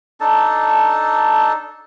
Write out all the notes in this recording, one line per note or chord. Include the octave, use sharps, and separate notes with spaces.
D4 D#4 A4 A5